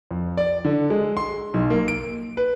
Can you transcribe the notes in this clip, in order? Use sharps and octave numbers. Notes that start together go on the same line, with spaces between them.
F2
D5
D3
G#3
C6
B1
A#3
D7
B4